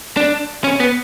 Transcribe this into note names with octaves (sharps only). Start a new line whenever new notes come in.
D4
C#4
B3